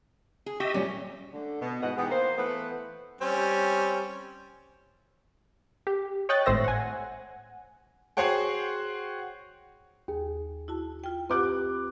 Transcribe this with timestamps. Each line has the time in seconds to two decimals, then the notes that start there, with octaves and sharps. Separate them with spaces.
0.46 G#4
0.60 G4 D#5 E5 C#6
0.74 A#2 F#3 G3 C#4 C#5 D5
1.33 D3 A3
1.61 B2 B3
1.81 G#2 B2 E3 F#4 D#5 F#5
1.97 E3 G#3 B3 D#4 G4
2.10 A#3 C5
2.37 E3 A3 B3 B4
3.21 G3 C4 C#4
5.87 G4
6.29 C#5 D#5 G5 F#6 A6
6.46 G#1 A2 C5 E5 A#6
6.64 F#5 G#5
8.17 F#4 G#4 C5 C#5 F#5 G5
10.08 D#2 G#4
10.68 E4 F#4 A5
11.04 F4 G5
11.30 C4 F4 G4 B4 D6 F#6